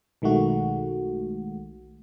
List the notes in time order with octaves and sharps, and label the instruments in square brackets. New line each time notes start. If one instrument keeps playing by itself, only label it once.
[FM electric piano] B1 D#3 G#3 A3 F#4